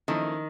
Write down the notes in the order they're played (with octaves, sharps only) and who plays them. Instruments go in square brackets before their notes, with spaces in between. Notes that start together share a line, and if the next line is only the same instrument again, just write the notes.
[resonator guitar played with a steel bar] D#3 [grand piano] F3 A#3 C#4 E4 A4